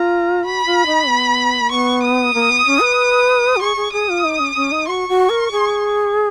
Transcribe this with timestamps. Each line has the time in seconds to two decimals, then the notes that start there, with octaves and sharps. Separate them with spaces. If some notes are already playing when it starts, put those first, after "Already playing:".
Already playing: F4 A#5
0.44 F#4 B5
0.66 F4
0.87 D#4
1.08 B3
1.61 A#3
1.71 B3 C#6
2.03 D#6
2.34 A#3
2.50 B3
2.66 C#4
2.81 B4
3.56 F#4
3.61 G#4 C#6
3.77 G#4
3.92 G#4 D#6
4.09 F4
4.24 D#4
4.40 C#4
4.56 C#4
4.72 D#4
4.88 F#4 C#6
5.09 F#4
5.30 A#4
5.52 G#4